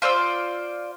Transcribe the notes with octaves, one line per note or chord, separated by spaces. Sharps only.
F4 C5 D5 E6